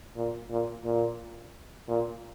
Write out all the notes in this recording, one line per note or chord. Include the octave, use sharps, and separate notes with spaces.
A#2
A#2
A#2
A#2